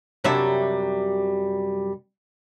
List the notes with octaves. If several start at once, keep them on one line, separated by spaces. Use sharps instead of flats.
F#2 C3 F#3 G3 D4 E5